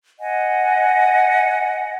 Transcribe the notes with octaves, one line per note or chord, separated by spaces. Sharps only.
D#5 F#5 G#5